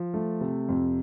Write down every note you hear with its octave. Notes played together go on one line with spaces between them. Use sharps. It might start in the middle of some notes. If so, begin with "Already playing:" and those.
Already playing: F3
A3
C3
F2